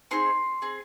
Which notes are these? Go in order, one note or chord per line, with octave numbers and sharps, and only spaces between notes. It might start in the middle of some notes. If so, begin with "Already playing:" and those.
C4 D#4 G#4 C6
C4 G#4